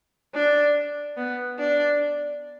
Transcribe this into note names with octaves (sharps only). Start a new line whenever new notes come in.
D4
B3
D4